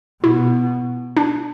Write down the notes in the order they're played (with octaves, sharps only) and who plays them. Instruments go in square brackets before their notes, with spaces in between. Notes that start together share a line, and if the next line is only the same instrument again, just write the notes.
[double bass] B2 [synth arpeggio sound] E4
[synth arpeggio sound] D4